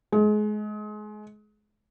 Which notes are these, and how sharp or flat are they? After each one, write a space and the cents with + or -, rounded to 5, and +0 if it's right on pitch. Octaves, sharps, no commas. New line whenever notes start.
G#3 +30